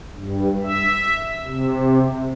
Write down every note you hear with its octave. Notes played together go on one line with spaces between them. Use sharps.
G2
E5
C3